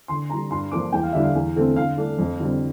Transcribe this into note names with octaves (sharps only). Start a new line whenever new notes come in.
D3 C6
G3 D4 A#5
G2 C6
F3 A#3 D4 D6
E2 G5
F5
D3 G3 D4 E5
F5
E2
D3 A3 C4
D3 F5
A3 D4
F2
D3 G3 C4